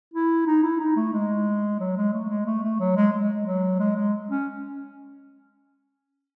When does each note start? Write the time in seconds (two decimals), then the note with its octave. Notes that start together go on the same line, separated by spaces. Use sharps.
0.14 E4
0.47 D#4
0.64 E4
0.80 D#4
0.97 A3
1.14 G#3
1.80 F#3
1.97 G#3
2.13 A3
2.30 G#3
2.46 A3
2.63 A3
2.80 F#3
2.96 G#3
3.13 G#3
3.46 F#3
3.80 G#3
3.97 G#3
4.30 C#4